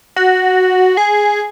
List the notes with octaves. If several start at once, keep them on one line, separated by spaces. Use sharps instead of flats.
F#4
G#4